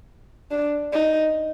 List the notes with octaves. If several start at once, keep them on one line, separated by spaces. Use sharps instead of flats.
D4
D#4